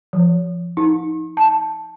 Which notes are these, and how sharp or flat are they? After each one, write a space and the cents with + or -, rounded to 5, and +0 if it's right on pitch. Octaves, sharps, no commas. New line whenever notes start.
F3 -15
D#4 +30
A5 -5